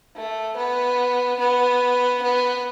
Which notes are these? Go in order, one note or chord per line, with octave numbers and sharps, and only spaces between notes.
A3
B3
B3
B3